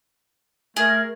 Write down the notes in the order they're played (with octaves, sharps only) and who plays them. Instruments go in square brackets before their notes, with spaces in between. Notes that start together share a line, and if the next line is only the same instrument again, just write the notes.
[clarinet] A3 [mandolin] G#4 [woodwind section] A#4